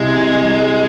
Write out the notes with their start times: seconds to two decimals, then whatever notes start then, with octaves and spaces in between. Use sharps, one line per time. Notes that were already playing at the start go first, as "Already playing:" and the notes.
Already playing: C2 C3 G3 G#3
0.16 C2
0.45 G3